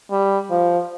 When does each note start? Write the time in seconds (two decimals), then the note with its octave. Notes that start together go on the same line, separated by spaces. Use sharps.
0.11 G3
0.50 F3